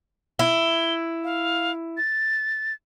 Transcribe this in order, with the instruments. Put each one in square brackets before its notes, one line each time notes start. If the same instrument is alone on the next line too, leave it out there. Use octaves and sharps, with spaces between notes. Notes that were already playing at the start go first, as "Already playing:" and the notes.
[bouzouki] E4 [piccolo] G7
[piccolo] F5
A6